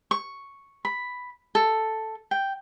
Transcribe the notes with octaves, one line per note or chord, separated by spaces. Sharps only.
C#6
B5
A4
G5